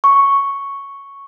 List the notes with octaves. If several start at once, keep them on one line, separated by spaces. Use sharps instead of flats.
C#6